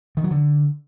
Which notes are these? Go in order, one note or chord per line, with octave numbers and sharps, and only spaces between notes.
D#3
F#3
D3